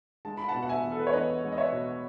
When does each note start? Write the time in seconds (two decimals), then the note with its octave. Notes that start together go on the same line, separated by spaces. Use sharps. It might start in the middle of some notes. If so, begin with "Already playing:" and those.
0.25 G#3 A5
0.37 B5
0.48 F#5 A5
0.55 B2
0.62 F#5
0.69 E5 G#5
0.84 E2
0.92 A4
0.99 B4
1.07 C#5
1.13 E2 B4 D#5
1.43 G#3
1.52 D#5
1.57 C#5 E5
1.72 B2